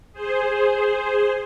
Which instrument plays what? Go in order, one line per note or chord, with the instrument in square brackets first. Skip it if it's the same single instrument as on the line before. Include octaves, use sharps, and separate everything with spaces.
[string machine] G#4 C5